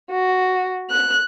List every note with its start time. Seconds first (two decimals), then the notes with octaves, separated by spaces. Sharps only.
0.11 F#4
0.91 F#6